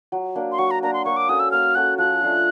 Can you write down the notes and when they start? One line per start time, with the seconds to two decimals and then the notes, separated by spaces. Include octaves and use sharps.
0.12 F#3
0.35 A#3 D4
0.52 C6
0.58 F#3 C#6
0.71 A#5
0.83 A#3 D4 A#5
0.93 C6
1.05 A#3 C#6
1.17 D6
1.29 C#4 F#4 A4 D#6
1.40 E6
1.51 A#3 F6
1.75 C#4 F#4 A4 F#6
1.98 F3 F#6
2.21 A3 D4 F4